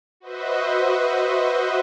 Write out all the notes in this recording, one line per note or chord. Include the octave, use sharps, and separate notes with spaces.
F#4 B4 C5 D#5 E5